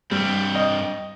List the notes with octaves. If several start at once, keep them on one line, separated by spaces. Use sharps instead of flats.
G2 G3 C4
D#5